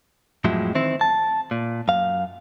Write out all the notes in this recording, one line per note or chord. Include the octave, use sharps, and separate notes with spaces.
F2 A2 F3 F#3 G#3 E4
D#3 E3 C4 E4
A5
A#2
F#2 F5